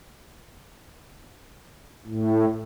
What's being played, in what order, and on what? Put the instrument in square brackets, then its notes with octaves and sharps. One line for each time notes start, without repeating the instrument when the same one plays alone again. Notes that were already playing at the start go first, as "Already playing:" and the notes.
[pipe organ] A2